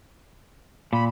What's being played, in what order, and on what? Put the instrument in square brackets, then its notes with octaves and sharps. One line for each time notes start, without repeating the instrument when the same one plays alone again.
[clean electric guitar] A#2 [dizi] B5